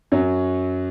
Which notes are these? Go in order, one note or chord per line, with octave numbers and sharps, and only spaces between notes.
F#2 F#3